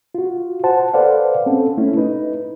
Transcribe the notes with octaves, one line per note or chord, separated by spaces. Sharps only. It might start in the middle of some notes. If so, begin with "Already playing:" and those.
F4 F#4
C5 F#5 A5
A4 B4 C5 D5 F5 F#5
C4 C#4 A4
A3 C#4 E4
D#4 B4